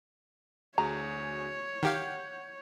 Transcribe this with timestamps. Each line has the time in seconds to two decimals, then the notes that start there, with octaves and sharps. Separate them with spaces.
0.78 D2 F#4 G#4 C#5 A#5
1.83 D#3 G4 F5 F#5 G6